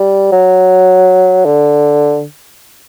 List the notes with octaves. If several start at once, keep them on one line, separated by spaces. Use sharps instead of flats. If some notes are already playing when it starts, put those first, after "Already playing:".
Already playing: G3
F#3
D3